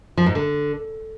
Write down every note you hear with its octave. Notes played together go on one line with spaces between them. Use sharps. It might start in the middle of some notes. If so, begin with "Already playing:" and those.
F3
G#2
D3